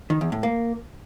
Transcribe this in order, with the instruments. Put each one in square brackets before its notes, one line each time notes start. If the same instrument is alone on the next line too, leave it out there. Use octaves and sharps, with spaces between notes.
[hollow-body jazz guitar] D#3
E2
A2
A#3